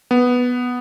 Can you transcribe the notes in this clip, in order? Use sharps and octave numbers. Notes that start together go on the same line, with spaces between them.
B3